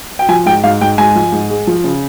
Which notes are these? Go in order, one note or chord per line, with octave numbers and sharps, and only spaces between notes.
G5
F3 G#5
G#2 G5
G#2 F5
G#2 G5
G#2 G#5
F3
G#2
G#3
F3
C#3